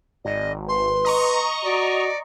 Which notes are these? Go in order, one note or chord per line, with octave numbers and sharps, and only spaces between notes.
G#1 D5 D#5
B4 C6
D#5 A#5 C#6
F#4 D5